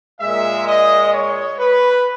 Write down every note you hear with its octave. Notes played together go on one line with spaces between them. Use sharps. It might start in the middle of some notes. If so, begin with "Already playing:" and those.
A#2 G#3 E5
D#5
C#5
B4